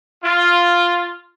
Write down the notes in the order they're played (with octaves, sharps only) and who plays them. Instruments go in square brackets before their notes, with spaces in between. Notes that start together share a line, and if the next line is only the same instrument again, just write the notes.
[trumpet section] F4